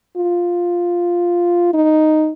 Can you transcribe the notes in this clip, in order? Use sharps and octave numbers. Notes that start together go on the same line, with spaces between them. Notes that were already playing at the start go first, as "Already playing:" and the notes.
F4
D#4